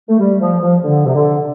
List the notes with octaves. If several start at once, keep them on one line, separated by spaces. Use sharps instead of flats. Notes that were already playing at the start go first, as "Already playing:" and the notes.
A3
G3
F3
F3
D3
C3
D3